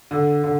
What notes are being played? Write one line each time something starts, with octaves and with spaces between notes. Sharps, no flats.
D3
D3